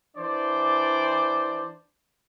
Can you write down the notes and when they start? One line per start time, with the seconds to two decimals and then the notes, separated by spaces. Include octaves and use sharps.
0.17 E3 D4 C5 D5